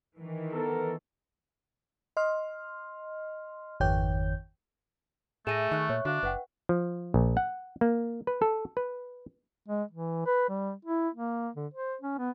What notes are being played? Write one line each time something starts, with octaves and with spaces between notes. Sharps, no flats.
D#3 E3
B3 A4 A#4
D#5 C6 F6
G#1 F2 D#3 C#5 G5 G6
A2 A3 G#4 E5 G#5 A#6 D#7 E7
D#3 E5 C#6 F#6
A#2 C#5
D3 D4 F#4 F5
F#1 B4 F#5 G5
F3
A#1
F#5
A#3
B4
A4
B4
G#3
E3
B4
G3
E4
A#3
D3
C5
C#4
B3